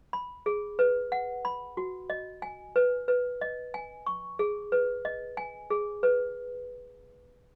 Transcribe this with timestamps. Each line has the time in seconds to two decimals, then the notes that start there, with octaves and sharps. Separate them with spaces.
0.13 B5
0.46 G#4
0.79 B4
1.12 F#5
1.45 B5
1.77 F#4
2.10 D#5
2.42 G#5
2.76 B4
3.08 B4
3.41 D#5
3.74 G#5
4.06 C#6
4.39 G#4
4.72 B4
5.05 D#5
5.37 G#5
5.70 G#4
6.03 B4